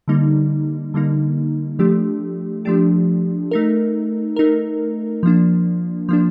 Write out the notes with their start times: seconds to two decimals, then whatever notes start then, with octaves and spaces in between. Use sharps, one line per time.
0.08 D3 G3 A#3 D#4
0.94 D3 G3 A#3 D#4
1.79 F3 A3 D4 G4
2.65 F3 A3 D4 G4
3.51 A3 D#4 A#4
4.36 A3 D#4 A#4
5.23 F3 A#3 D4
6.09 F3 A#3 D4